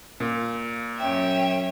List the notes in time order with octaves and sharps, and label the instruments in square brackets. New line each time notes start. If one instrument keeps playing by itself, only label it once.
[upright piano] A#2
[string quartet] F#2 C#4 E5 [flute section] G5